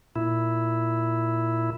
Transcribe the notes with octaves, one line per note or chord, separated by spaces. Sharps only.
A#2 E4